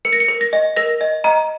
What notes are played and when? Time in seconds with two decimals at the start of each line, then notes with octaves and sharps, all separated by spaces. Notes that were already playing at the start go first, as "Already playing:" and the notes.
0.05 A#4 C#7
0.13 A#6
0.20 C#7
0.28 A#4
0.41 A#6
0.53 D#5
0.76 A#4 A#6
1.01 D#5
1.24 D#5 A#5